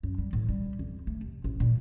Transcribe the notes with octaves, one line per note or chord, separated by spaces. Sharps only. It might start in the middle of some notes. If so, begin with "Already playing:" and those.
F#2
G3
A2
G3
F2
A3
C3
A1
A#2